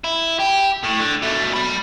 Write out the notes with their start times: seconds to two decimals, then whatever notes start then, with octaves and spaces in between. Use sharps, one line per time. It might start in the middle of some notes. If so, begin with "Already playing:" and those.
0.04 E4
0.40 G4
0.84 A2
0.99 D3
1.22 B2 A3
1.54 D5 B5